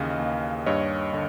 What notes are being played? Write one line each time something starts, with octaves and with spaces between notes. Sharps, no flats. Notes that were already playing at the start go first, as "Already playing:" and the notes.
Already playing: D#2 C#3 E3 D#5 F5
D#2
G2 C#5 D#5
D3